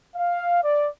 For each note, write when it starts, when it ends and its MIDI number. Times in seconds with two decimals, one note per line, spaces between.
0.15 0.59 77
0.63 0.88 74